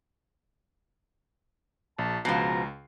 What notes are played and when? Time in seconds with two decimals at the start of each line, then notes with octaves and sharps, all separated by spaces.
1.99 A#1 A5
2.25 C#2 B2 F3 A#5 C7